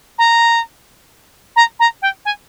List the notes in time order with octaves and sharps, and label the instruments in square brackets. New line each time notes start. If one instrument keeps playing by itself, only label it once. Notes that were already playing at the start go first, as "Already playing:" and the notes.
[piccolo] A#5
A#5
A#5
G5
G#5